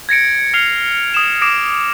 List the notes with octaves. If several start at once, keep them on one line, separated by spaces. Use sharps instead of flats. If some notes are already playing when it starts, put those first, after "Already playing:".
G#6 A#6 C#7 D7
F6 C7 C#7 F7
D#6 E7
D6 D#6 A#6 C7 D7 E7